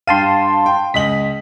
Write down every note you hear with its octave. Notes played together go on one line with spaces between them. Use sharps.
G2 F5 G5 A5 C6 D#7
G5
C#2 D#5 B6 F#7